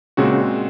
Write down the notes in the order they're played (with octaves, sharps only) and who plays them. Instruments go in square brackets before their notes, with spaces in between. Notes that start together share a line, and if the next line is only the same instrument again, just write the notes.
[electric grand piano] A#2 G#3 C4 F#4 [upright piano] C#3